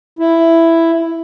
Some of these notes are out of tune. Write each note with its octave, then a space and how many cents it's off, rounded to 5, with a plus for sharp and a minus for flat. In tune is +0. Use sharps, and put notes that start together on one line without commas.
E4 +5